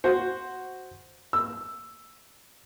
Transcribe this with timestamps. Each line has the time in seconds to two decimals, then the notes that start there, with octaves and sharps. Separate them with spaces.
0.04 F#4 C5
1.33 E6